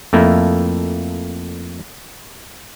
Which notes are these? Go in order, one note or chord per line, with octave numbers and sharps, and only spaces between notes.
F2 A3 A#3 E4